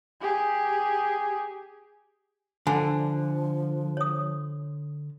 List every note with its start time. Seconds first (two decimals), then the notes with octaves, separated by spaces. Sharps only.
0.21 G4 G#4
2.67 D3 F3 G#5 B5
3.97 C#5 D#6